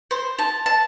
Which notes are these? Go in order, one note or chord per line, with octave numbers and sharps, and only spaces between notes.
C5
A5
A5